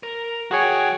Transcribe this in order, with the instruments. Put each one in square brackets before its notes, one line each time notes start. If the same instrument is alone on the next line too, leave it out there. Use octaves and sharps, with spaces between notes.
[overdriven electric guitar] A#4
[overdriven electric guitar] F#3 G5 [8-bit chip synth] F#4 G#4 C#5